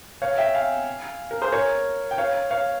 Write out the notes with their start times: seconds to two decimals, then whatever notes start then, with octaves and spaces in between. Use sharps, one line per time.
0.22 C#5 F5
0.38 E5 G5
0.54 F5 G#5
1.31 A#4
1.41 G#4 C5
1.52 A#4 C#5
2.11 G5
2.18 C#5 F5
2.51 C#5 F5